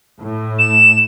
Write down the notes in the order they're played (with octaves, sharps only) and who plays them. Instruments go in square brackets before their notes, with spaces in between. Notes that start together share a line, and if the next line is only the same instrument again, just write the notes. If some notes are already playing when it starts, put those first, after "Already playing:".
[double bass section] A2
[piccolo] E7